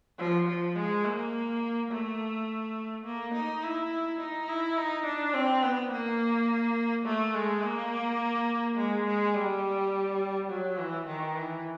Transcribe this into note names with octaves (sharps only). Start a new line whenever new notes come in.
F3
F3
G#3
A#3
A3
A#3
D#4
E4
D#4
E4
D#4
D4
C4
B3
A#3
A3
G#3
A#3
G#3
G#3
G3
F#3
E3
D#3
E3